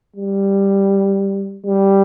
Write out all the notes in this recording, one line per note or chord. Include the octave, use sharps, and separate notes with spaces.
G3
G3